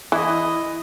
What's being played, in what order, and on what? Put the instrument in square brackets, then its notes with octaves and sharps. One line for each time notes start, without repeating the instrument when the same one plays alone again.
[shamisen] E3 [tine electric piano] E4 [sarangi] D#5